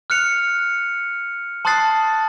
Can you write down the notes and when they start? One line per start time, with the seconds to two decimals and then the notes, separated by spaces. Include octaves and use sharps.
0.10 F6 F#6 C#7 F7
1.65 A5 C6 D#6 F#6 A6 C7